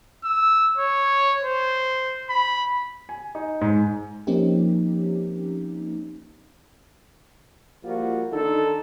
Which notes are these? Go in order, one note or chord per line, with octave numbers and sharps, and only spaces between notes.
E6
C#5
C5
B5
G#5
D#4
G#2
F3 A#3 C4 C#4 D#4 G4
F3 G3 A#3 F4 F#4
D3 D#3 D#4 A4